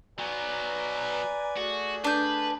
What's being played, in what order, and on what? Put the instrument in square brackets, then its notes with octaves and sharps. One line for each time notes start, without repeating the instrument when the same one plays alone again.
[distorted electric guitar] F#3 B3 [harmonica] B4 G#5 A#5 [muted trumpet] D5
[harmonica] A3 G#4 [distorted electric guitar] F#4
[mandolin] D4 G6 [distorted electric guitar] B4